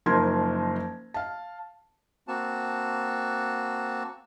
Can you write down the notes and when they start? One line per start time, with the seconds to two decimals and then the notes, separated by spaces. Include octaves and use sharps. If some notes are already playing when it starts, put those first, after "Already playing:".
0.06 F#1 F3 D#4 A#4 C6 G#6
1.14 F5 A5
2.28 A#3 C4 F#4 A5